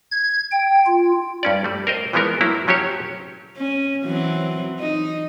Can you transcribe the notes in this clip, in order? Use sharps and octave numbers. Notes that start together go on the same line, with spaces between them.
G#6
G5
F4
G2 C#4 D5
G3 A3
A#4 C5 D#5
E3 F3 G#3 B3 A#4
F#3 A#3 E4 C#5
F3 F#3 C#4 G4 C#5
C#4
E3 F#3 C4
D#4